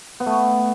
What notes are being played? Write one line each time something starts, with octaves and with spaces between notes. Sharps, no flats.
B3
A3